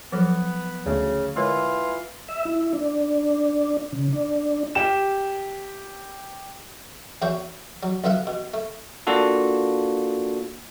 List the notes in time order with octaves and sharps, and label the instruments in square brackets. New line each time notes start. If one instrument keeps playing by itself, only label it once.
[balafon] F3 F#3 A4 [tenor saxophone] B3
[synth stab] D2 [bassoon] C#3
[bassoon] E3 [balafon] G#3 A#4 C#5 [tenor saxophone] F4
[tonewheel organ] E5
E4
D4
C#3
D4
[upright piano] G4 E7
[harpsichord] E2 E4 F#4 C#5 G5
F#3
B1 B3 F4 E5 F#5
B2
A3
[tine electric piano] A#3 D4 F4 F#4 A4